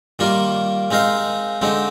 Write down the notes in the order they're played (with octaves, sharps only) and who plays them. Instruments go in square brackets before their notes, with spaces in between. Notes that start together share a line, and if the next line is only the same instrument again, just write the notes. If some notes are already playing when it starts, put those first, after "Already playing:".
[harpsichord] D#3 G3 A#3 F4 A#4
G#3 C4 D#4 A#4 F5
D3 G#3 C4 D#4